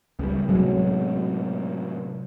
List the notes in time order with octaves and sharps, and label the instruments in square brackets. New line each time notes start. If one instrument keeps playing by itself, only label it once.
[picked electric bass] C#2 G3
[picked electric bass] A2 C3 G#3 [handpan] F#3